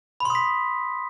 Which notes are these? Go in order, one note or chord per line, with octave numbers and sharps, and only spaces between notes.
B5 C6 D#6 B6